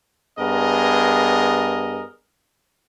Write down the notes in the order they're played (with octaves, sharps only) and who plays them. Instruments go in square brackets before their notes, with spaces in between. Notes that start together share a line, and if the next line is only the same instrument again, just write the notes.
[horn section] G2 B3 G#4 A#4 D#5